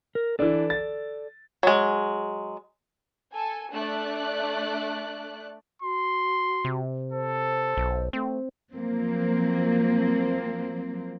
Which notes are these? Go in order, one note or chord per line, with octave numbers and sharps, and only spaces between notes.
A#4
E3 D4 A4 D5
A6
F#3 G#3
A4 G#5
A3 D4 D5 F#6
F#4 C6
C3
A4 C5
B1
A3 C4
F3 F#3 A#3 C4